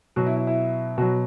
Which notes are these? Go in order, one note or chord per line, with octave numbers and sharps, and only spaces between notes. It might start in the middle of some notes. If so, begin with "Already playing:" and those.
B2 F#3 F#4
E4
E4
E4
B2 F#3 F#4